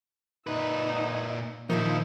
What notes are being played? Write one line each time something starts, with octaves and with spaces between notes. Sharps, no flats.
A#2 D#4 B4 E5
A#2 D#3 F3 A#3 D#4 E4 E5